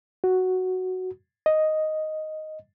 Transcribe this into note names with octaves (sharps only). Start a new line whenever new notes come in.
F#4
D#5